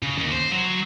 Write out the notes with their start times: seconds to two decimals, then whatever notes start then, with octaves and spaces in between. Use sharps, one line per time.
0.03 C#3
0.18 D#2
0.32 C5
0.52 F#3